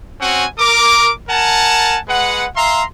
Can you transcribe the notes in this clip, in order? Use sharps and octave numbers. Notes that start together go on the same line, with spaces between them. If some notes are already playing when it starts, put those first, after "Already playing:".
C4 C#4 F#4 F#5 G#5
A#4 D6
A#4 F#5 G#5 A5
G#3 B4 F#5
E5 F5 A#5 C6